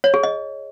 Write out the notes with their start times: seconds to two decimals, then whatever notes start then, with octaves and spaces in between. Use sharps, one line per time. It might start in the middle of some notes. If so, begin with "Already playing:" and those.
0.04 C#5
0.14 G#4
0.23 D#5